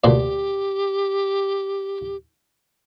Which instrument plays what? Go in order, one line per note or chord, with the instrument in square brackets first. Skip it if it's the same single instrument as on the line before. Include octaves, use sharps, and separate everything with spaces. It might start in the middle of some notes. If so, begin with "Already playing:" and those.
[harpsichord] D2 A#2 D5 [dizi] G4